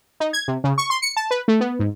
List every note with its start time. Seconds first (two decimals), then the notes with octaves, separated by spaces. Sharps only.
0.20 D#4
0.33 G#6
0.48 C3
0.64 C#3
0.78 C#6
0.90 C6
1.02 C#7
1.16 A5
1.31 B4
1.48 A3
1.60 B3
1.79 G#2